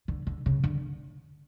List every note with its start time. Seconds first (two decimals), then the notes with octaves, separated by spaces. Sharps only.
0.08 D3
0.27 D3
0.46 C#3
0.64 D3